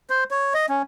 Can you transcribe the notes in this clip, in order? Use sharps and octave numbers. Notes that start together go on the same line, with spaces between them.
C5
C#5
D#5
C#4